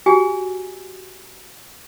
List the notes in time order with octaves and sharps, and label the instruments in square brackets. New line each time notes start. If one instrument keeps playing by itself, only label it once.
[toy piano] F#4 G4 G#5